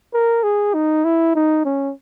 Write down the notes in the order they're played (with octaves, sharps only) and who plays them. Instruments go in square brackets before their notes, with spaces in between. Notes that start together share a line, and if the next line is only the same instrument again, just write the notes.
[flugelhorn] A#4
G#4
D#4
E4
D#4
C#4